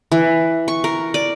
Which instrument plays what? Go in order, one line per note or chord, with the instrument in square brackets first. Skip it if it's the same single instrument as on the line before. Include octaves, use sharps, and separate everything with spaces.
[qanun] E3
C#6
A#4
D5